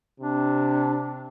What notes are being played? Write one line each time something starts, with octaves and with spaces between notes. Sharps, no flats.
C3 D4